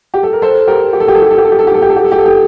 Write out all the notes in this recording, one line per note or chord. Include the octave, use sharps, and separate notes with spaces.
G4
A4
A#4
A4 C5
G4 A#4
G4
A4
G4
A4
G4
A4
G4
A4
G4
A4
G4
A4
G4
A4
G4
A4
G4
A4
G4